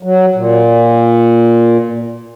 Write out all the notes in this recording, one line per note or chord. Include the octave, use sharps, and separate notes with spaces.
F#3
A#2